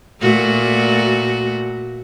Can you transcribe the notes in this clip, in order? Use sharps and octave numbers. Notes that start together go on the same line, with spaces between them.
A#2 A3 F#4